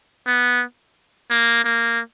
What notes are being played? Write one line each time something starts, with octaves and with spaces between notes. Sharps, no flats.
B3
A#3
A#3